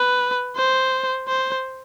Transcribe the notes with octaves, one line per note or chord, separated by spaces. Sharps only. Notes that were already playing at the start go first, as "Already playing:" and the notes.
Already playing: B4
C5
C5